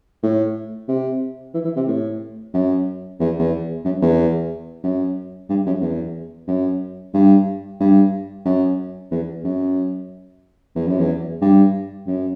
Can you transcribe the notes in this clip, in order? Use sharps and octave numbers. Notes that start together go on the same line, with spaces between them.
A2
C3
E3
E3
C3
A2
F#2
E2
E2
F#2
E2
F#2
G2
F#2
E2
F#2
G2
G2
F#2
E2
F#2
E2
F#2
E2
G2
F#2